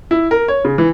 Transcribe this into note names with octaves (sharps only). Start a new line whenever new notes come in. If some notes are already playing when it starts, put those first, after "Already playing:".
E4
A#4
C#5
C#3
E3